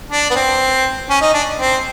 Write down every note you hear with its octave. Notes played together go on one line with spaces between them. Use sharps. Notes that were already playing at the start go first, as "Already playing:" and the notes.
D4
B3
C4
C#4
D#4
D4
C4